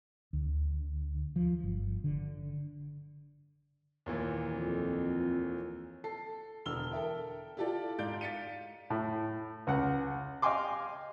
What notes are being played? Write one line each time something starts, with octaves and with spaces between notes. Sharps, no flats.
D2
F3
G1
D3
D#2 A#2 E3
F2
A4 C7
E1 D3 E6 F6 G7
A4 A#4 E5 G5
E4 F4 G4 A4 D5
G#2 D5 F5 G6 D7
F5 A6 B6 C#7 D#7
A2
C#2 F#5
D#5 F5 G5 G#5 C6 D6